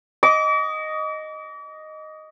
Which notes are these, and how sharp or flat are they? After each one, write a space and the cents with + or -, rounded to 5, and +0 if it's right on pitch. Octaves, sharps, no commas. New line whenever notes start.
D#5 +0 D6 -40